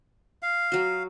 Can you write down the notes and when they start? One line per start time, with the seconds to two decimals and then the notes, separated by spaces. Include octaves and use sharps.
0.43 F5
0.72 F#3 F#4